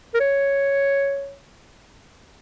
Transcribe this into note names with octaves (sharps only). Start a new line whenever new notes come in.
A#4
C#5